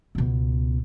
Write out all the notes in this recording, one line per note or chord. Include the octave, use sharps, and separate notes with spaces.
C#2 B2